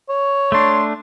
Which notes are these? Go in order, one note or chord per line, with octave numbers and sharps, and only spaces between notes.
C#5
A3 D4 C6